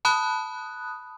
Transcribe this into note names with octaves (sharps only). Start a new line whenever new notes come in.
A5 B5 D#6 F#6